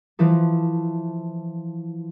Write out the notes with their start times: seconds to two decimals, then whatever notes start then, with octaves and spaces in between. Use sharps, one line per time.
0.19 E3 F3 E4 A4